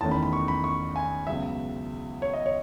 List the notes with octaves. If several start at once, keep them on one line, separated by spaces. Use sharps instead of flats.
E2 D#3 A3 C#4 A5
B5
B5
C#6
B5
C#6
G#5
C#2 C#3 F#3 B3 E5
C#5
D#5
C#5